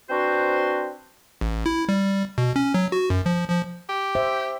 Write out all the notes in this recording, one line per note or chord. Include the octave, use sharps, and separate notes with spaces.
C4 D4 F#4 B4 C5
A1
E4
G3
B2
C#4
F#3
F#4
F#2
F3
F3
G4
C5 E5